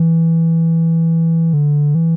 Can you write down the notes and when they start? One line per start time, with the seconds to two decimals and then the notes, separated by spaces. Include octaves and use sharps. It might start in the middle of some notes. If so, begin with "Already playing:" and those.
Already playing: E3
1.53 D3
1.95 E3